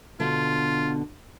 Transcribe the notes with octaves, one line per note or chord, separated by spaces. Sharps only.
B2 D3 F4